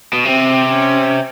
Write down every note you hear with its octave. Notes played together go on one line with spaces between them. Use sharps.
B2
C3 C4
C#4